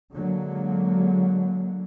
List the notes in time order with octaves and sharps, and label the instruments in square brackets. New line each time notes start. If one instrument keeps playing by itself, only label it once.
[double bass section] D3 F#3 G#3 A#3